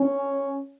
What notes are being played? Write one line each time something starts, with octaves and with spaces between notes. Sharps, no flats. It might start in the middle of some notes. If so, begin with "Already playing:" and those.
Already playing: C#4